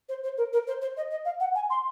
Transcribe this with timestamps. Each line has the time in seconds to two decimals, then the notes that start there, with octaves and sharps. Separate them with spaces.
0.08 C5
0.23 C5
0.37 A#4
0.53 A#4
0.67 C5
0.81 C5
0.96 D#5
1.10 D#5
1.25 F5
1.40 F#5
1.55 G#5
1.70 C6